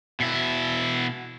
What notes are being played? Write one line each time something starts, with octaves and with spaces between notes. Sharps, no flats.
B2 E4